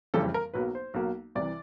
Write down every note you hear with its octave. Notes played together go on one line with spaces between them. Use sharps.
F#1 F2 C#3 E3 G3 A4
A#4
B1 B2 F#3 A#3 B4
C5
B1 B2 F#3 A#3
C2 C3 E3 D5